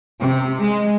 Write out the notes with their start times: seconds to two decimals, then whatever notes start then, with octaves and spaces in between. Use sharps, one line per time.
0.21 C3
0.61 G#3